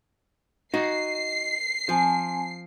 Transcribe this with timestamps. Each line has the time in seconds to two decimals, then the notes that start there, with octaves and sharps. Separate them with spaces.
0.74 D#4 F#4 C7
1.89 F3 C4 G#5 A5